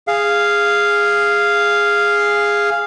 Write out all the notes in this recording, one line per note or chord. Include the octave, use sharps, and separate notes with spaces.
G#4 F5